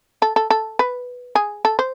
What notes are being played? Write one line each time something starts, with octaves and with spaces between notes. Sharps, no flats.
A4
A4
A4
B4
G#4
A4
C5